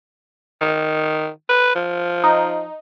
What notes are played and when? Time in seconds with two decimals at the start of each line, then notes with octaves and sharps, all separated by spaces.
0.61 D#3
1.49 B4
1.75 F3
2.24 D#4